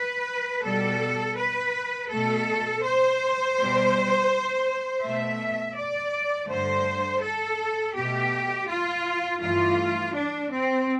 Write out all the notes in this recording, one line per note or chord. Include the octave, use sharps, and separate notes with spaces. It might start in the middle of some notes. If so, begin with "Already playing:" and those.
Already playing: B4
B2 G3 A4
B4
B2 A3 A4
C5
B2 G3
B2 A3 E5
D5
G2 D3 A3 C5
A4
B2 A3 G4
F4
G2 E3 A3 F4
D4
C4